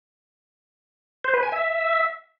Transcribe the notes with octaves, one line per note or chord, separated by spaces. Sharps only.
C5
B4
G#5
E5